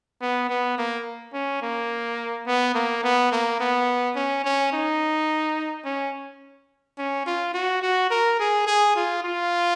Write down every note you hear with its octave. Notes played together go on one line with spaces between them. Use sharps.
B3
B3
A#3
C#4
A#3
B3
A#3
B3
A#3
B3
C#4
C#4
D#4
C#4
C#4
F4
F#4
F#4
A#4
G#4
G#4
F4
F4